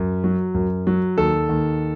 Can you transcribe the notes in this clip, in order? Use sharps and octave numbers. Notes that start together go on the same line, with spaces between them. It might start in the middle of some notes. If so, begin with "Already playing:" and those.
Already playing: F#2
F#3
F#2
F#3
D#2 A4
D#2